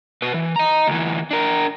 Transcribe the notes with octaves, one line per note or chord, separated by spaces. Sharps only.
B2 B4
E3
D#5 A#5
D2 E3
D4 A#4